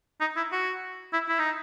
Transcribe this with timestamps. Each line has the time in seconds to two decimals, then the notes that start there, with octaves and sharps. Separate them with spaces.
0.21 D#4
0.36 E4
0.52 F#4
1.13 E4
1.29 E4
1.39 D#4